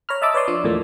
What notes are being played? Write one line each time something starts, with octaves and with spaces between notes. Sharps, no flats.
C#5 A#5 B5 F6
D#5 E5 A5 B5 D6 E6
B4 C#5 D5 C6 D#6
F3 D4
E2 A2 F3 A#3